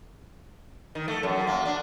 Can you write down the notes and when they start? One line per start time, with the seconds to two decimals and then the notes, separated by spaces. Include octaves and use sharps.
0.95 D#3
1.08 A3
1.23 F#2
1.47 A#3
1.66 D4